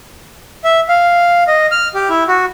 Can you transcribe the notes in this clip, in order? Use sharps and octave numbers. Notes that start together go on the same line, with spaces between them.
E5
F5
D#5
F6
G4
E4
F#4